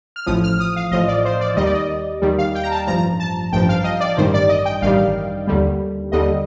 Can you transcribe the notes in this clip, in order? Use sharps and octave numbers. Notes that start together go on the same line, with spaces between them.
F6
A1 A2 F3 D#6
F6
D#6
F5
A1 A2 F3 D#5
D5
C5
D5
D#2 D#3 G3 D#5
D5
D#5
D#2 D#3 G3
F5
G5
A#5
A5
A1 G2 F3 A#5
A5
A1 G2 F3 G5
F5
D#5
D5
A1 G2 D#3 G3 C5
D5
D#5
G5
A1 G2 D#3 G3 F5
D#2 D3 G3
D#2 D3 G3 D#5